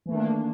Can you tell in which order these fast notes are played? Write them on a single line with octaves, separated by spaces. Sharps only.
E3 A3 D#3 D4 A#3